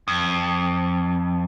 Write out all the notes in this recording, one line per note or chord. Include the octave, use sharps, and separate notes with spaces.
F2